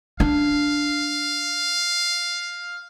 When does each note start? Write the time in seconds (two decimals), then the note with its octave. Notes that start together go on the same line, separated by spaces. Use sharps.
0.20 D4 F5